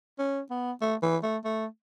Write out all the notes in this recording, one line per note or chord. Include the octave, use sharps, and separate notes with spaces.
C#4
B3
A3
E3
A3
A3